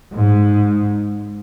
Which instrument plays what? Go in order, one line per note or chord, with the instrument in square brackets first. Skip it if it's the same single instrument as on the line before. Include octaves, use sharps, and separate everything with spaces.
[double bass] G#2